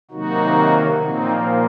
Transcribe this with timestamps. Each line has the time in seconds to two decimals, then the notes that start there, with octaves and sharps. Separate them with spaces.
0.11 C3 D#3 F#3 A#3 D#4 F#4
1.01 A#2 F3 A#3 C4 D#4